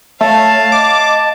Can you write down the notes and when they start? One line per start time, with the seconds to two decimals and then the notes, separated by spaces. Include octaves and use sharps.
0.21 A3 C#5 F5 A5
0.72 D#5 D6